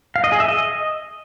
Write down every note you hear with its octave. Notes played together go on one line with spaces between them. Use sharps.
F5
D#5
G#4
E5
D#5